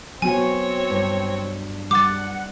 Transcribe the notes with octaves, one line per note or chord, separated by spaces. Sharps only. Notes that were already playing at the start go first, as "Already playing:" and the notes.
F#3 B3 C4 F#4 C#5 G#5
G2
G3 F#5 D6 A6